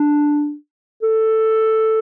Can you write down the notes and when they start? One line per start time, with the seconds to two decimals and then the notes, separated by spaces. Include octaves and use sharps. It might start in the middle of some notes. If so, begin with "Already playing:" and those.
Already playing: D4
1.03 A4